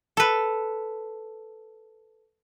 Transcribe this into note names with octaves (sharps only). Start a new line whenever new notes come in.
A4 B4